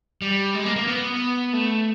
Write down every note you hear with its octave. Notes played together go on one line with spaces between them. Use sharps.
G3
G#3
A#3
A#3
B3
A3